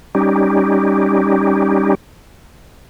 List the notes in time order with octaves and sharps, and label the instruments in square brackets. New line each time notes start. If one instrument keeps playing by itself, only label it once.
[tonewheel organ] G3 C#4 D#4 G4